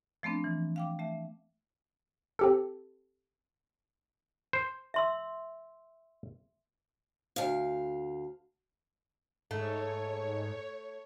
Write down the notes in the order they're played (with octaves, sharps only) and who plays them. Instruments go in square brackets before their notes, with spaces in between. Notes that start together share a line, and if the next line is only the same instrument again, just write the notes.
[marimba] F3 A3 B3 C4 D4
E3
F5 G5 D6
A3 E5
[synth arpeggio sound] C4 G4 A4
[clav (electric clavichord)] C5
[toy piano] E5 C6 E6
[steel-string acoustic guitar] D2 F5
[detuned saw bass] G#2 [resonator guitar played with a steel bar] A3 [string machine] C#5